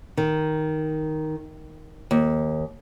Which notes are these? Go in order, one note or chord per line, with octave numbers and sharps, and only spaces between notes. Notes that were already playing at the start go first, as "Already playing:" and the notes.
D#3
D#2